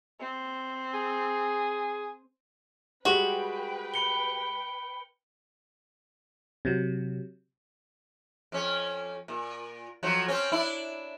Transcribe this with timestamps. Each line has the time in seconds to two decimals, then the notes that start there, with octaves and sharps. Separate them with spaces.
0.19 C4
0.94 G#4
3.05 G3 G#3 F#4 G4 B4 G5
3.94 B5 C#7 G7
6.65 C3 F#3
8.52 F2 C#4
9.28 A#2
10.03 F2 F3 F#3
10.28 C4 C#4
10.52 D4 E4